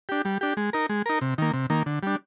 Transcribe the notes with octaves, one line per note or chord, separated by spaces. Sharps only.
D4 G4
G3
D4 G4
G#3
D#4 A#4
G#3
D#4 A#4
C3
D#3 A#3
C3
D#3 A#3
D3
G3 D4